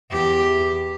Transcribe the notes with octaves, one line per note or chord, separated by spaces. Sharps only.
E2 G4